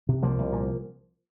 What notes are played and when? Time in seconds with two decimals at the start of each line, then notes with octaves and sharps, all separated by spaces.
0.09 C3
0.23 C2 F3 A#3
0.39 C2
0.52 A#2